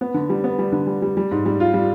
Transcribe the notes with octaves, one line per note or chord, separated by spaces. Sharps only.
B3
D3
G3
B3
G3
D3
G3
G3
G3
G#2
G3
F4
G3